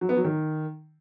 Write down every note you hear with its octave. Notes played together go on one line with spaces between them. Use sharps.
F#3
B3
F#3
D#3